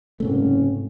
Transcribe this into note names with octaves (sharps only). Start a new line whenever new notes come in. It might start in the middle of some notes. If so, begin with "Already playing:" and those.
F#1 G#2 C3 A3 C#4